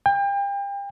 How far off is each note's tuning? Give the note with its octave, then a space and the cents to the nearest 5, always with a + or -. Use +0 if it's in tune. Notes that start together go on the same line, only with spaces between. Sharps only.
G5 +35